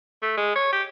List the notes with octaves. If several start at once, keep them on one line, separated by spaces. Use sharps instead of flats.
A3
G#3
C#5
G4